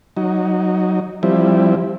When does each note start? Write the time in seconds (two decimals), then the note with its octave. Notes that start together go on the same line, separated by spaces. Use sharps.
0.17 F#3 D#4
1.23 F3 G3 C4 E4